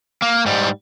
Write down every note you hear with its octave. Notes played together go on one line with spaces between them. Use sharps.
A#3
G#2 G3